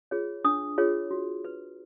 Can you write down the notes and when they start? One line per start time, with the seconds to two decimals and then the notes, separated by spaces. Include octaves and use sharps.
0.11 F4 G#4 C#5
0.44 D4 D#6
0.78 F4 G#4 C#5
1.11 F#4
1.45 B4